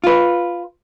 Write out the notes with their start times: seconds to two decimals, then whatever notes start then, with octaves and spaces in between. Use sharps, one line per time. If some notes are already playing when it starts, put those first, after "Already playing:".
0.04 F4 B4